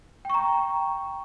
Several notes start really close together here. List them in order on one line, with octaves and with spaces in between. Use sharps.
G5 C#6 A#5